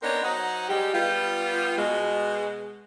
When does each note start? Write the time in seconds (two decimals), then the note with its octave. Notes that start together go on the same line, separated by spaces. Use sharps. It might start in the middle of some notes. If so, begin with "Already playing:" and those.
0.02 B3 C4 D4 D#4 A#4 C#5
0.23 F#3 D#4 C5 D#5 F#5
0.68 G3 G#3 G4
0.94 G3 B3 F4
1.78 B2 G#3